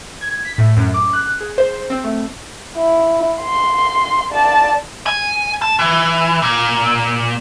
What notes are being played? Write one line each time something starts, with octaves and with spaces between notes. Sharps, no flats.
G#6
B6
A2
F#2
D6
F#6
G#4
C5
C4
A3
E4
C6
D5 A5
G#5
A5
E3
A#2